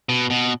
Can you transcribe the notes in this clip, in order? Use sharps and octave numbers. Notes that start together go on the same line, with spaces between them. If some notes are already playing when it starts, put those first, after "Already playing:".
B2
B2